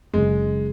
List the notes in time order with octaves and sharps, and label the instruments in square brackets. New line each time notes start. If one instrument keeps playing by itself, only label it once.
[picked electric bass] F#1 F#2 C#3 [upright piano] G#3